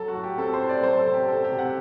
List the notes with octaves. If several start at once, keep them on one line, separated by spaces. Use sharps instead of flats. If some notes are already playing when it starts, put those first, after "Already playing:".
Already playing: F#3 A4
F#4
A2
G4
C4 A4
C5
A2
D5
F#3 C5
A4
C3
G4
C4 A4
G4
C3
F#5